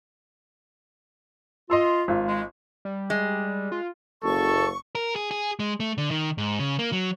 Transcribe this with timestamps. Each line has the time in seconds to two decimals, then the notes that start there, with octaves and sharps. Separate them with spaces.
1.70 F4 D#5 C6 E6
2.08 G#1 F4
2.26 G#3
2.85 G3
3.10 G#3
3.72 F4
4.23 F#1 A4 C#6
4.95 A#4
5.16 G#4
5.31 G#4
5.60 G#3
5.80 A3
5.98 D3
6.11 D#3
6.38 G#2
6.59 C#3
6.79 A#3
6.92 F#3